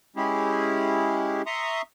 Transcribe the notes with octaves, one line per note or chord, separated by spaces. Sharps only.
G#3 C#4 E4 G4 G#4
E5 A#5 C6 C#6 D#6